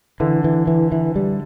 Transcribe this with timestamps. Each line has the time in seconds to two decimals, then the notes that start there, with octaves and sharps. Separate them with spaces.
0.20 D3 E3
0.44 E3
0.67 E3
0.92 E3
1.16 G3